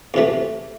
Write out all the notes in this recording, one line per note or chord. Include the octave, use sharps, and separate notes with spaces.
E2 C3 E3 A3